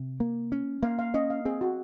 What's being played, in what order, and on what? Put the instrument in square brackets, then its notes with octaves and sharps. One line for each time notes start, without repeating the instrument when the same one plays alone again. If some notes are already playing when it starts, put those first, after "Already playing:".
Already playing: [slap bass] C3
A#3
C#4
[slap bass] A#3 [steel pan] F5
[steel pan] F5
[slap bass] C#4 [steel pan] D#5
[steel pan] F5
[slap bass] C4 [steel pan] G#4
[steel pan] F#4